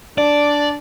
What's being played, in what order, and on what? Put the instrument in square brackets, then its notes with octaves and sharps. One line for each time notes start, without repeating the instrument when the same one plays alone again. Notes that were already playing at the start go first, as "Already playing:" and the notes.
[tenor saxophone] D4 [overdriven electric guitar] D5